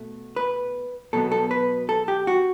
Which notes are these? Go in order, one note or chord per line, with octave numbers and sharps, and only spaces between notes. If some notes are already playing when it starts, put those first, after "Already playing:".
Already playing: B2 A3
B4
B2 F#3 B3 A4
A4
B4
A4
G4
F#4